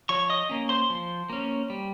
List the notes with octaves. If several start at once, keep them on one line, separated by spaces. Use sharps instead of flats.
F3 C#5 C#6
D#5 D#6
A#3 C#4
C5 C6
F3
A#3 C#4
G3